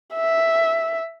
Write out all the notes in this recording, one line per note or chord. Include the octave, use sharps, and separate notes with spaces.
E5